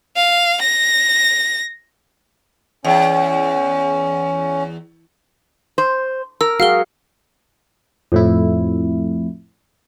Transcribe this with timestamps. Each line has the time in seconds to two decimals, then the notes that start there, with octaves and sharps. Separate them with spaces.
0.17 F5
0.62 A#6
2.84 E2 C#4
5.78 C5
6.41 A#4 E6
6.60 F#4 G#4 F5 F6 G7
8.12 F2 A2 E4